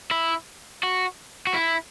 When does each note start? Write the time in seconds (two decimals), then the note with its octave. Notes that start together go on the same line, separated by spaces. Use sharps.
0.11 E4
0.83 F#4
1.47 F#4
1.54 E4